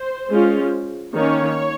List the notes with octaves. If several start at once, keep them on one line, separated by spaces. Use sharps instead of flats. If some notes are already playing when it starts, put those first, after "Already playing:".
Already playing: C5
G#3 C#4 F4
D#3 A#3 C#4 C#5